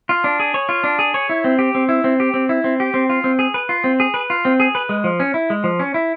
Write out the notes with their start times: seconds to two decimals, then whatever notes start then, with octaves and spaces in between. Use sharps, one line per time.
0.09 F4
0.24 D4
0.40 G#4
0.54 C#5
0.69 F4
0.84 D4
0.99 G#4
1.14 C#5
1.29 E4
1.44 C4
1.59 G4
1.75 C4
1.89 E4
2.04 C4
2.20 G4
2.34 C4
2.49 E4
2.64 C4
2.80 G4
2.94 C4
3.09 F4
3.24 C4
3.39 G#4
3.54 B4
3.69 F4
3.84 C4
4.00 G#4
4.14 B4
4.30 F4
4.45 C4
4.60 G#4
4.75 B4
4.89 G#3
5.04 F3
5.20 C#4
5.34 E4
5.50 G#3
5.64 F3
5.79 C#4
5.94 E4